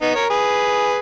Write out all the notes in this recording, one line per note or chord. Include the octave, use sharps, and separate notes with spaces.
B3 D#4
A#4 C#5
G#4 B4